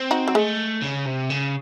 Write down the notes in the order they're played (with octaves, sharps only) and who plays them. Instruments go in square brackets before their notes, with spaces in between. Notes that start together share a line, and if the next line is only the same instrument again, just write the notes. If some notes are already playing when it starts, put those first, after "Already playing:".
Already playing: [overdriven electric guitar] C4
[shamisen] D#4 F#4
F#3
[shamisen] G#3 [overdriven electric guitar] A3
[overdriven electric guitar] C#3
C3
C#3